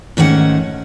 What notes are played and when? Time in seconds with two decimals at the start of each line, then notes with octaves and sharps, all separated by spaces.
0.17 G#2 D#3 A3 C#4 F#5